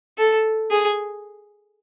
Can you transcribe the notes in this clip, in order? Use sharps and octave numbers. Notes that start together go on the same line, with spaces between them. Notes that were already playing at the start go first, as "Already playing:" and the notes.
A4
G#4